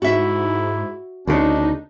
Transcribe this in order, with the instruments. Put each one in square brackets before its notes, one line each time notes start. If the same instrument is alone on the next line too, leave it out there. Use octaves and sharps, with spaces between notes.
[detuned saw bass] G#2 [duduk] E4 [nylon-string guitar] F#4 E5
[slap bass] D2 C#3 [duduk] D4 [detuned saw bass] D#4